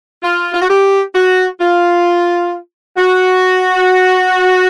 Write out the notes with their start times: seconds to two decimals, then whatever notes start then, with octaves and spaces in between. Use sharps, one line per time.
0.23 F4
0.53 F4
0.61 F#4
0.69 G4
1.14 F#4
1.60 F4
2.97 F#4